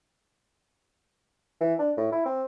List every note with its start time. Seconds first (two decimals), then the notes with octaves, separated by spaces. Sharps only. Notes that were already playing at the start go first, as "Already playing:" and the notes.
1.61 E3
1.79 D4
1.97 A2
2.12 E4
2.26 C4